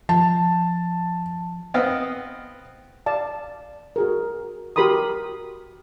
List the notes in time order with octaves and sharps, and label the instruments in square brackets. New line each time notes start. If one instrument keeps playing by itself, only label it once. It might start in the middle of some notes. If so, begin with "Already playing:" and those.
[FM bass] F3 [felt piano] A5
[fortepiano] B3 C4 D#5 F5
[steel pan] D5 F5 A5
F#4 G#4 A#4
F#4 G4 A#4 B5 C6 D#6